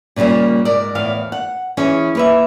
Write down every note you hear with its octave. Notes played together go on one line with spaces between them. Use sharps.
A#2 C#3 F3 G3 A#3
G#2 A#4 D5
E2 A2 F5
F#5
E3 C#4 G#4
A#3 B4 E5